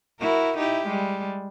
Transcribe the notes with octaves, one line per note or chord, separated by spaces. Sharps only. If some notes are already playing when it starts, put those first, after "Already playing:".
E4 F#4 A#4
D#4 E4 G4
G3 G#3